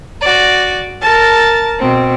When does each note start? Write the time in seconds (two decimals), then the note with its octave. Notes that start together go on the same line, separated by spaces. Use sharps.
0.21 F#4 D5
1.01 A#4 A5 A6
1.80 B2 C4